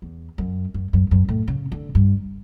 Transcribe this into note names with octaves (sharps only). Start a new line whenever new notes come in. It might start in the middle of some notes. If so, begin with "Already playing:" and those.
E2
F#2
F#2
F#2
F#2
A2
C#3
D3
G2